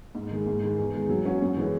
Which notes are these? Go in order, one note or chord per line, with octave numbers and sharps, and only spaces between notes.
G#2
D#3 G#3
G#2
D#3 G#3
E2
D#3 G#3
F#3
C#4 F#4
F#2
E3 G#3 C#4